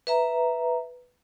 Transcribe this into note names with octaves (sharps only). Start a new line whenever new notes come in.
B4 E5 A#5